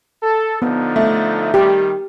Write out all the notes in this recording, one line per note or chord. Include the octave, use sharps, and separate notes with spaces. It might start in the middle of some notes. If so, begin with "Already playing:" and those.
A4
D3 F3 B3 D#4
A3
D#3 G3 G4